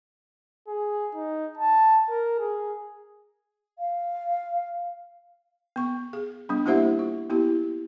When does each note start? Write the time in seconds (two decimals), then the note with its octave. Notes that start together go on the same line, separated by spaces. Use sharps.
0.68 G#4
1.15 D#4
1.57 A5
2.09 A#4
2.39 G#4
3.77 F5
5.76 B3 C#6
6.13 G#4
6.49 G3 B3 D4
6.66 A#3 E4 G4 C5 E5 F#5
6.99 F4
7.30 B3 E4 G4